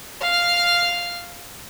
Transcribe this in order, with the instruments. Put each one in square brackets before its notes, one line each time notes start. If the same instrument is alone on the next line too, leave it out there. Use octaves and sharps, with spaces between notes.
[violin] F5 F6